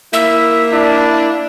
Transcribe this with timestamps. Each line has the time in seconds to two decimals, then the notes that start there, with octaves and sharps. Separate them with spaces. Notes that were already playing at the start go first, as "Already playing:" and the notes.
0.13 A#3 E4 E5
0.73 D4 E4